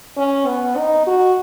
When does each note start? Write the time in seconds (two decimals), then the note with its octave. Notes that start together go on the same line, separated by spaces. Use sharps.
0.17 C#4
0.47 B3
0.77 D#4
1.07 F#4